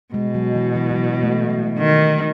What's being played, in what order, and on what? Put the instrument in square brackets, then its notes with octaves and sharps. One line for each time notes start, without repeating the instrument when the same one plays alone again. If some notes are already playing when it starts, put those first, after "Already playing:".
[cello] B2 [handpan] G#3
[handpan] F#3
E3
E3
E3
F#3
A3
[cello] D#3